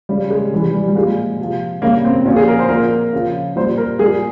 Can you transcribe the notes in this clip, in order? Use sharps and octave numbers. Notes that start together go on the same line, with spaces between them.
C#3 G3
G#3
C3 E3 G3
G3
G3
A#2 F3 G#3
C3 F3
C#3 G3 A#3
C4
A#2 F3 C#4
G#4
A#4
C5
A#2 F3 A#4
C#3 F3
A#2 G3 C5
A#4
A#2 G3 G#4